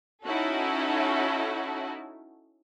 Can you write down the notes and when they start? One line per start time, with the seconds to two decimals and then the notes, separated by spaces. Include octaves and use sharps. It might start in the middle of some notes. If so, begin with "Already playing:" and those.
0.25 C#4 D#4 E4 F#4 A4